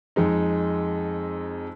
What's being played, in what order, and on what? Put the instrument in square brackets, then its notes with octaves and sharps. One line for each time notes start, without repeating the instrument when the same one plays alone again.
[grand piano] F2 G#3 D#4